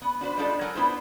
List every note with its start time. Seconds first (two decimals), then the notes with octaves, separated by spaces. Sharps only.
0.02 B3
0.21 D4 F#4 B4 C5
0.38 G3 G#3 B3 D4 F4 A4
0.61 F#3 A#4 F#5 G#5
0.75 B3 D4 E4 F4 B4 C5